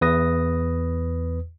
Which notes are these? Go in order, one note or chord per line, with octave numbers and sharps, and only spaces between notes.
E2 B4 D#6 A#6